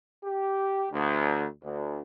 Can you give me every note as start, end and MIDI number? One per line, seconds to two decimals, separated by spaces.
0.24 0.87 67
0.92 1.45 38
1.64 2.01 38